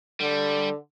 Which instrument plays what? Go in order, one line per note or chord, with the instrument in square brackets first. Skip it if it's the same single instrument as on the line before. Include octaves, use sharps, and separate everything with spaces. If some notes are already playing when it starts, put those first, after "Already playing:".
[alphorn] D3 [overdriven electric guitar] G3